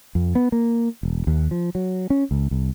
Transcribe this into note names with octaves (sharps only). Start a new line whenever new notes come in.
F2
B3
A#3
E1
D#2
F3
F#3
C#4
C#2
C2